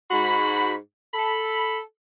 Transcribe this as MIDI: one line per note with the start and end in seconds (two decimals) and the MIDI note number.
0.11 0.74 44
0.11 0.74 66
0.11 0.74 83
1.14 1.79 69
1.14 1.79 83